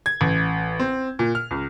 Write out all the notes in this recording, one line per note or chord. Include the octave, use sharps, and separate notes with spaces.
G#6
A1
C4
A#2
F6
C#2